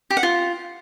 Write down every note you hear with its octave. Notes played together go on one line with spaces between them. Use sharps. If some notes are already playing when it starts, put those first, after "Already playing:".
G4
F#5
F4